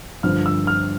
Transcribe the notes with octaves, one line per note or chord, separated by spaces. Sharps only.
G2 D3 F3 F6
E6
F6